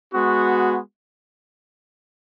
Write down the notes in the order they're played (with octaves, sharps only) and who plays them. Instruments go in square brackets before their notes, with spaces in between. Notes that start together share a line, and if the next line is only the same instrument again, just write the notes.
[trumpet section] G#3 B3 F#4